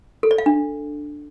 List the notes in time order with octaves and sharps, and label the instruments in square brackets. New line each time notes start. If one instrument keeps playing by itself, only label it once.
[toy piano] A4
D5
F5
D4